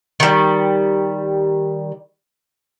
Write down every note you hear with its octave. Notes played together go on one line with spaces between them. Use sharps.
D#3 G3